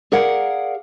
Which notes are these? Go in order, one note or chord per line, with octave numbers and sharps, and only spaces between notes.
G#4 A#4 D5 F5 F#5